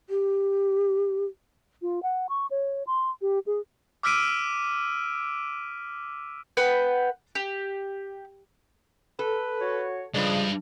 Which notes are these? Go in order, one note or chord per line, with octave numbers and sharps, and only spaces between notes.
G4
F4
F#5
C#6
C#5
C6
G4
G#4
D6 E6 F6 B6 D7 D#7
B4 F#5 G5
G4
A4 B4
F#4 C#5
G2 C#3 F3 G#3 D4